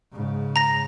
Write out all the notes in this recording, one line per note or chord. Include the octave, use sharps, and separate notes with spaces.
G#2 C#3
A#5 A#6